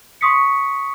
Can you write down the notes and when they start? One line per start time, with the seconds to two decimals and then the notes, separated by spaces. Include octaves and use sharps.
0.21 C6 C#6 D#6 B6 C#7